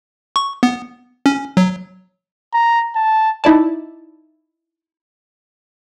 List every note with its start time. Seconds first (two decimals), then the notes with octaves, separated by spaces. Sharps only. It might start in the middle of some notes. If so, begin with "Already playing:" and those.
0.36 C#6
0.63 B3
1.26 C#4
1.57 F#3
2.54 A#5
2.95 A5
3.44 D#4 E4 D5 A5